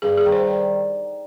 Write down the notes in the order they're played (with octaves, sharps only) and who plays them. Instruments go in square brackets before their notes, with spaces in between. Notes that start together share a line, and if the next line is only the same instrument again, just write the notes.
[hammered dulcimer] G2 [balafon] G#4
[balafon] G#4
[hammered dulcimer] D#3 G3
[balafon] C5
C5